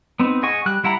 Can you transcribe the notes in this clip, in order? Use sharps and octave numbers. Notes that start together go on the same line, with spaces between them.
B3 C4 D#4
G#4 D#5 F#5 G#5 C#6
G3 F#6
G3 E4 F#5 A#5 B5